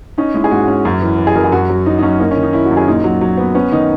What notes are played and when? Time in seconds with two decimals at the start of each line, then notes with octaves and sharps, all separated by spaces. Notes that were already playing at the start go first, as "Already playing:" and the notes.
0.18 C#4 D#4
0.34 G#3 E4
0.44 G#4
0.51 G#2 F#4
0.68 C#4
0.85 F#2
1.02 E3
1.18 E3
1.27 G#4
1.35 F#2 A#4
1.44 G#4
1.52 F#2 F#4
1.69 F#3
1.86 F#3 D#4
1.99 D#4
2.03 F#2 C#4
2.19 A#3 D#4
2.31 C#4
2.36 D#3
2.43 D#4
2.53 C#4 E4
2.65 F#4
2.71 F#2
2.77 G#4
2.87 A#2 D#4
3.04 F#3
3.21 F#3
3.37 B3
3.55 B3 C#4
3.72 D#3 D#4